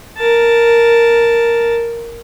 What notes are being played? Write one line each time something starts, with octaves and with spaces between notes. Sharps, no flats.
A#4 A5